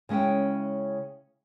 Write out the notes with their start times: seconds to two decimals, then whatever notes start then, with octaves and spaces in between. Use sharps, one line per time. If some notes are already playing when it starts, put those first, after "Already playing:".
0.09 C#3 G#3 C#4 E4 G5